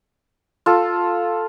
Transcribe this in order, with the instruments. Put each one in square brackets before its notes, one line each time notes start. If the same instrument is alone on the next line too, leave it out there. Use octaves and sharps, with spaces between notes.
[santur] F4 A4